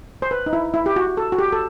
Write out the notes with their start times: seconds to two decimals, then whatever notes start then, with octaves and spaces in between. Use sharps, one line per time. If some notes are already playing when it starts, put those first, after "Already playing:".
0.22 C5
0.31 B4
0.46 D#4
0.53 E4
0.74 E4
0.86 G4
0.96 F#4
1.17 A4
1.32 F#4
1.39 G4
1.52 A4